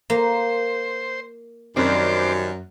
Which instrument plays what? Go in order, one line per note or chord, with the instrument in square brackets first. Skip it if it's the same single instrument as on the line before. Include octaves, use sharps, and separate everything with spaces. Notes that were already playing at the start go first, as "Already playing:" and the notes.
[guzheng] A#3 [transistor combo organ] C5
[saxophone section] F#2 [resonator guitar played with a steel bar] D#3 G3 C4 [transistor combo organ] C5 D6